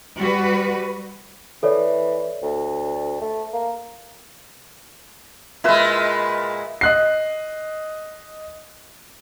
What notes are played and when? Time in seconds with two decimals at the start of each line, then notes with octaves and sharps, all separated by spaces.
0.19 G3 F#4 B4
1.63 E3 A4 C#5 D5
2.42 D2
3.21 A3
3.53 A#3
5.64 A#2 G#3 E4 B4 E5
6.81 D#5 F#6 C7